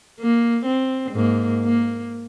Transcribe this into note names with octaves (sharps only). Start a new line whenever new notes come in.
A#3
C4
G#2 A#3
A#3